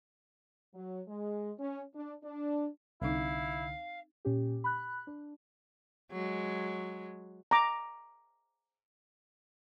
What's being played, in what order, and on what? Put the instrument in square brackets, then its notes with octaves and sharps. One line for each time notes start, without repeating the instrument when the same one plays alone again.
[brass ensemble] F#3
G#3
C#4
D4
D4
[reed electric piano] C2 D3 [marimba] C4 D#4 [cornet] E4 [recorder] F5
[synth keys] A#2 C#4 G4
B5 F#6
D4
[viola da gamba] F#3 G#3
[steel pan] A#5 D6